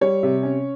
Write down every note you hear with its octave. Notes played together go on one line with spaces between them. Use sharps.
G3 C#5
C3
C#4